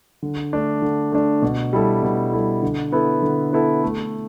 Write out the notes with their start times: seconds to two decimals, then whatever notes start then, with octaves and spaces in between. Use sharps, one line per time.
0.22 D3
0.53 A3 D4
0.82 D3
1.12 A3 D4
1.42 B2
1.73 G3 E4 A4
2.03 B2
2.32 G3 E4 A4
2.62 D3
2.92 B3 E4 A4
3.22 D3
3.53 B3 E4 A4
3.83 A3